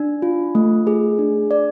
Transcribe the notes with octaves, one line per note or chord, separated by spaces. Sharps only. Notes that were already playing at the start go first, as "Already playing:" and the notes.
Already playing: D4
F4
A3
G#4
D4
D5